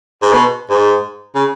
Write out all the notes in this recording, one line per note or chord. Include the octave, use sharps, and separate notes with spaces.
G#2
B2
G#2
C#3